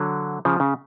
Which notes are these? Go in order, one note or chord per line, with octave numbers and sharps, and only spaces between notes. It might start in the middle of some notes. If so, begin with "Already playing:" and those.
Already playing: D3 F#3
C#3 F3
C#3